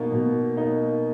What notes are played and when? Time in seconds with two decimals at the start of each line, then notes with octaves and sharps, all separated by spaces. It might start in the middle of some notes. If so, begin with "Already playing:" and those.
Already playing: B2 A#3 D#4
0.12 B2
0.57 A#3 D#4